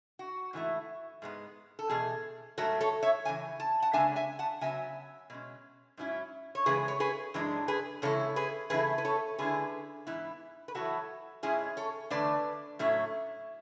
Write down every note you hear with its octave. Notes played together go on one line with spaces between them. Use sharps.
F#4
G#2 E3 A3 E4
G#2 G#3 B3
A4
E2 B2 G#4
G#2 F#3 A3 F#4 A4
A4 C#5
C#5 E5
E2 C#3 E3 G#5
A5
F#5 A5
C#3 G#3 B3 D4 E5 G#5
E5 G#5
F#5 A5
C#3 F#3 B3 E5 G#5
B2 G#3 C#4
G#2 F#3 C#4 E4
C#5
C#3 E3 G#3 G#4 B4
C#5
G#4 B4
F#2 E3 G#3 D4
G#4 B4
E2 C#3 G#3 E4 A4 C#5
G#4 B4
C#3 E3 A3 E4 G#4 B4
B4
A4 C#5
D3 G#3 C#4 E4 G#4 B4
G#2 E3 B3 E4
B4
E2 B2 F#3 B3 E4 F#4 A4
G#2 G#3 C#4 E4 G#4
A4 C#5
E2 D3 A3 D4 B4 D5
A2 F#3 A3 C#4 E4